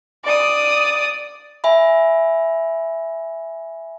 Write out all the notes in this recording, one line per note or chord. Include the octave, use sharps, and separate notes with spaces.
D5 D#6
E5 G#5 B5